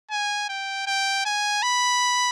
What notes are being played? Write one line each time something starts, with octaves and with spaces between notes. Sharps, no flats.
G#5
G5
G5
G#5
B5